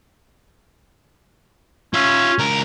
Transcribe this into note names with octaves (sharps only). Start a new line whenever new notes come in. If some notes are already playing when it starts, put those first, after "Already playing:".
C#4 F4 E5
C#2 A#4